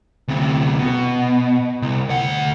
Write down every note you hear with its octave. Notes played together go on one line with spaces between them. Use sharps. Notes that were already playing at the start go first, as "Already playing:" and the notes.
D2 C3
B2
C2
D2 F#5